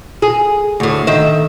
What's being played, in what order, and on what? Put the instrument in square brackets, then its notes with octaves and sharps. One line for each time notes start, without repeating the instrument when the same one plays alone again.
[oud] G#4
D2 A2
D#3 E5